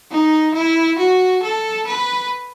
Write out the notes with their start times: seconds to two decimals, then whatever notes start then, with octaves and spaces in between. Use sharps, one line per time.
0.10 D#4
0.54 E4
0.98 F#4
1.42 A4
1.87 B4